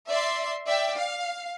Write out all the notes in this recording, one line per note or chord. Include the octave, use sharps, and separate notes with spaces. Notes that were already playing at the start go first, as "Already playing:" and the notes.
D5 E5 C6
D5 E5 G5
F5